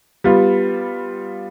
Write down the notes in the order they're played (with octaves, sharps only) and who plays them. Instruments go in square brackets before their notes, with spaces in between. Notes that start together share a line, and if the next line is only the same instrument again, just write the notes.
[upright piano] G3 B3 F4